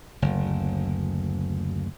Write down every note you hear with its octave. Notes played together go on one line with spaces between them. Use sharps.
F#1 D2